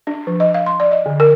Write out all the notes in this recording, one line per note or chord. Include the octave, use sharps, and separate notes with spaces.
D4
F3
D#5
F5
C6
D5
D#5
D3
A#4